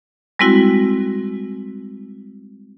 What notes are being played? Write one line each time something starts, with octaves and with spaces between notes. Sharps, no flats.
G3 G#3 C4 E4 F#4